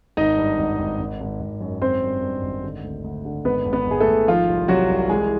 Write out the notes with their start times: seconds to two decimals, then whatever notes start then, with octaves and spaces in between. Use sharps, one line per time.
0.17 G#1 D#4 D#5
0.37 G2
0.59 G#1
0.79 G#1
0.99 G#1
1.20 G#1
1.41 G#1
1.61 F#2
1.81 G#1 C4 C5
2.02 G2
2.22 G2
2.42 G#1
2.64 D3
2.84 D2
3.04 D2
3.25 D3
3.45 G#1 B3 B4
3.66 G#1
3.73 B3 B4
3.86 G#1 G#4
4.00 A3 A4
4.07 G#1
4.28 D#3 F3 F4
4.48 C2
4.68 C3 F#3 F#4
4.89 C2
5.09 E3 G#3 G#4